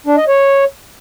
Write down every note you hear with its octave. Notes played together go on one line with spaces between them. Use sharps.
D4
D#5
C#5